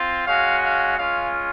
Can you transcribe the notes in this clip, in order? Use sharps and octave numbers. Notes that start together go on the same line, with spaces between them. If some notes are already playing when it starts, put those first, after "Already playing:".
Already playing: C4 F4
G#3 C#4 F#4 F5
F5
G#3 C#4 F4 F5